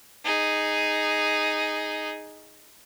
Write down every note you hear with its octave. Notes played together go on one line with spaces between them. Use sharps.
D#4 G#4